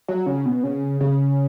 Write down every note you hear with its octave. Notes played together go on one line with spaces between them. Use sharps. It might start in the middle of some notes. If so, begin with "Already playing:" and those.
F#3
C#3
B2
C#3
C#3